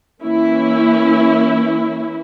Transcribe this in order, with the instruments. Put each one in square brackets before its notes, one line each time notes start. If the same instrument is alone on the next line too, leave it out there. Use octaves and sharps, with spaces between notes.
[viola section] E3 A#3 C#4 E4